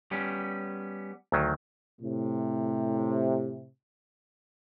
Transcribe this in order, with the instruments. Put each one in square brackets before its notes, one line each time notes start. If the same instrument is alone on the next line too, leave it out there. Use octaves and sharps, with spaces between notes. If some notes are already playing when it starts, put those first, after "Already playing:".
[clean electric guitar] G3 B3 C#4
[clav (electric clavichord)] D2 D#3 F#3
[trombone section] A2 C3